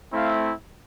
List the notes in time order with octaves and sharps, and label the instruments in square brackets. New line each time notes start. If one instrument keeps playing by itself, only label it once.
[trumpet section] A3 C4 E4 F5